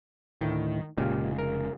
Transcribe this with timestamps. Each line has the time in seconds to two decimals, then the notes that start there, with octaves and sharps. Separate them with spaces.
0.41 D2 A2 D#3
0.97 F1 A#2 C#3 G#3 G4 F5
1.38 A#4